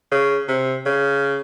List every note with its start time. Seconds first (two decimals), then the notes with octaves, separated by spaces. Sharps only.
0.12 C#3
0.48 C3
0.86 C#3